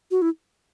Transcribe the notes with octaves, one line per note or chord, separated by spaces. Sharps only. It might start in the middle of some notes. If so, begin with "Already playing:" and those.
F#4
E4